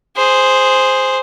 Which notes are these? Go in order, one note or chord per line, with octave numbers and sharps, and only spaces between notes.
G#4 C5